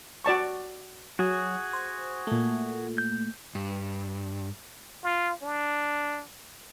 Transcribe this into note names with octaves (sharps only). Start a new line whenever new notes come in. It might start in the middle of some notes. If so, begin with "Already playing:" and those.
F#4 D5 A5 C#6
F#3 F#4 G#4
C5
A#2 A3
G6
G2
F4
D4